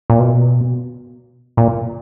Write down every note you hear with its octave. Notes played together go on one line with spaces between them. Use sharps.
A#2
B2
A#2